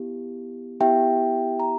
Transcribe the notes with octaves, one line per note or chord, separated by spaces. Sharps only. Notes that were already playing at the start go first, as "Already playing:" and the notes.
Already playing: B3 E4 G4
B3 E4 G4 E5 G5
A#5